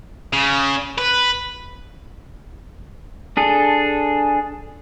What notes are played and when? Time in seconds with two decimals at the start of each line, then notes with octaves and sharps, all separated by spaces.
0.33 C#3
0.98 B4
3.37 D4 G#4 A4